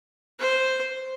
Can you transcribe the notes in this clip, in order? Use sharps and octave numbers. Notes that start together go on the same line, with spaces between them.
C5